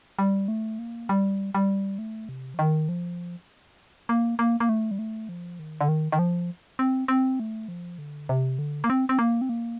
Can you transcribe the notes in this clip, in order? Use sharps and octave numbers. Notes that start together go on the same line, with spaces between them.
G3
A3
A#3
G3
G3
A3
C3
F3
D#3
F3
A#3
A#3
A#3
A3
G3
A3
F3
D#3
D3
D#3
D#3
F3
C4
C4
A3
F3
D3
C3
D3
A#3
C4
C4
A#3
C4
A#3